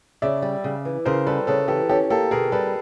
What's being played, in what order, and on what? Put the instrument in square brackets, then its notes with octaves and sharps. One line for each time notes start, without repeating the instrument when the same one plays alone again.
[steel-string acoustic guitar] C#3 [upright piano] D5 E5
[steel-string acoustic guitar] G3
C#3
E3
[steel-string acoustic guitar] C#3 [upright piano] A#4 C5
[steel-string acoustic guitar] G3 [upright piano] A4 B4
[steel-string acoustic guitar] C#3 [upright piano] A4 B4
[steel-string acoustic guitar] E3 [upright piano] G4 A4
[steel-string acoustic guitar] C#4 [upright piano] G4 A4
[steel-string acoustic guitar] A#3 [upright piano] G4 A4
[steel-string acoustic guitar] B2 [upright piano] G#4 A#4
[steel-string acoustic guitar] G3 [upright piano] A4 B4